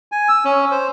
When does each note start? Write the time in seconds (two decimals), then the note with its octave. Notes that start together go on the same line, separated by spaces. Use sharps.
0.12 G#5
0.29 E6
0.45 C#4
0.71 C5